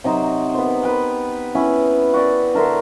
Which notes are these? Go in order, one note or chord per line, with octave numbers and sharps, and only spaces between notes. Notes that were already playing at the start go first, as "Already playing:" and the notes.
C3 F#3 D#4 C5
B3 C5
B4 G5
B3 C#4 E4 B4
F#4 D5 G5
D3 A#4 E5 C6